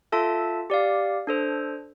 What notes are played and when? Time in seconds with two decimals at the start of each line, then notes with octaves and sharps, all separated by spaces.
0.12 F4 A4 E5 A5
0.70 G4 D5 F5
1.27 D4 A4 C5